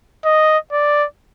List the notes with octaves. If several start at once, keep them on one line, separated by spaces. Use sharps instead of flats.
D#5
D5